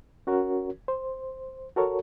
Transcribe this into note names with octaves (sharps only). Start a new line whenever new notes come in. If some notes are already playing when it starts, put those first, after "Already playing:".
C#4 F#4 A#4 C#5
C5
F#4 A4 A#4 C#5